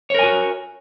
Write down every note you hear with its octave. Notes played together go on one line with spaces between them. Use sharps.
F#4 A#4 C#5 G#5